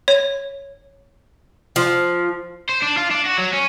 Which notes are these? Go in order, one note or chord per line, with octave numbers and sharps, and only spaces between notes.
C#5
F3
C5
D4
F4
D4
F#4
F#3
C#4